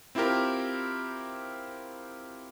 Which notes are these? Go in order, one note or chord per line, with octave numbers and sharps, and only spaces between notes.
C4 E4 F4 G4 A#4